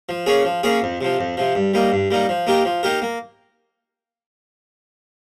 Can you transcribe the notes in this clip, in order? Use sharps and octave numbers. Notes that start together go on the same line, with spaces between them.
F3
A#3 C#4 G#4 C#5
F3
A#3 C#4 G#4 C#5
F2
C3 F3
F2
C3 F3
G2
G3 A#3 D#4
G2
G3 A#3 D#4
F3
A#3 D#4 G4 A#4
F3
A#3 D#4 G4 A#4
A#3